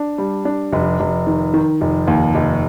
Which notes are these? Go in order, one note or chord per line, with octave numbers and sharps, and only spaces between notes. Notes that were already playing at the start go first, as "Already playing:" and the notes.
Already playing: D4
G3
D4
F1
F1
D#3
D#3
F1
D#2
F1